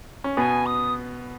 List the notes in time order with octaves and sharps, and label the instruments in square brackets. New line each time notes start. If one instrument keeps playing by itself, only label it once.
[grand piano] C#4
[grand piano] B2 B3 [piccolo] G#5
[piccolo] D#6